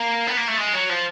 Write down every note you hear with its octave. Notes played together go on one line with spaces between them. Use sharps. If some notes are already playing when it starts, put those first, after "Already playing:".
Already playing: A#3
B3
A#3
A3
G#3
F#3
F3